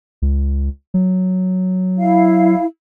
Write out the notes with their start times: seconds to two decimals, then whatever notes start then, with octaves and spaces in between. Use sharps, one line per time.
0.22 C#2
0.94 F#3
1.98 E4 F5